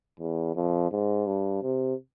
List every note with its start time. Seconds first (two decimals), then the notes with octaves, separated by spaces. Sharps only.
0.20 E2
0.56 F2
0.91 G#2
1.27 G2
1.62 C3